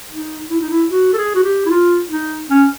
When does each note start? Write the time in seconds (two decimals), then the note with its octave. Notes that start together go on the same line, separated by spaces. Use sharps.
0.11 D#4
0.50 E4
0.60 D#4
0.70 E4
0.90 F#4
1.13 A4
1.17 G#4
1.35 F#4
1.44 G4
1.66 E4
1.70 F4
2.10 D#4
2.50 C#4